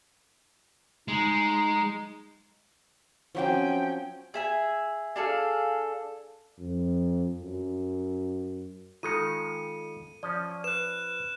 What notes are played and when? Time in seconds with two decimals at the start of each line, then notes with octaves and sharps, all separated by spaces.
1.08 G#3 D#4
3.35 F3 F#3 C4 C#4 G5
4.34 G#4 E5 G#5
5.16 D4 G#4 A4 F5
6.59 F2
7.43 F#2
9.03 D#3 G#3 D#4 F4 A4 C#7 D#7
10.23 F3 C#4 D5
10.64 B4 F#6 E7